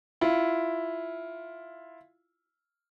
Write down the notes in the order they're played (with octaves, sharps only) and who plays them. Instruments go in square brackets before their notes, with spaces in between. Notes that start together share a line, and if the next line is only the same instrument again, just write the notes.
[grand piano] E4 F4